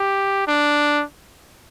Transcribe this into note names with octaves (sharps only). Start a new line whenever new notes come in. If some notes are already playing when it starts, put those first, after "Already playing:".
Already playing: G4
D4